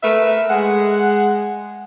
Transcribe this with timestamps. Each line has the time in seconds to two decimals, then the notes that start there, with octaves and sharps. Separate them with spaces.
0.03 A3 A#4 B4 E5
0.49 G#3 F#5